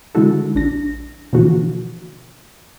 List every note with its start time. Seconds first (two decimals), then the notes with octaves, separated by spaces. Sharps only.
0.15 D3 D#3 G#3 E4 F#4 A4
0.55 A#1 D4 A#6
1.33 B2 D3 E3 F3 A#3 F#4